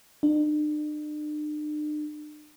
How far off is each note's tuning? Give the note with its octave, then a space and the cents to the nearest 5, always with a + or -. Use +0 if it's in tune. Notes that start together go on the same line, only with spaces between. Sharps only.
D4 +45